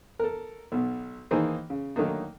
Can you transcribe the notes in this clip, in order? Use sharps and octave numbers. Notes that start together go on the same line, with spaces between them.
A4 A#4
B1 B2
D#3 E3 A#3 D#4 G#4 C5
C#3
D3 D#3 F#3 A3 A#3 D#4